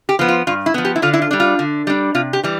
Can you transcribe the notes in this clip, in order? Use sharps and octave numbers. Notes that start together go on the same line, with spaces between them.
G4
F3 B3
F4
G2 F4
E4
F3 B3
G4
E4
D3 F4
E4
F4
G3 D4
F4
D3
G3 D4
C3 F4
G4
E3 G3